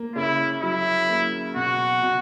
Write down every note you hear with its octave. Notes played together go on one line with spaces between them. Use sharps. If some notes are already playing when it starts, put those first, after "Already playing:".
Already playing: A#3
C#3 E4
F#3 E4
A#3
B2 F#4
B2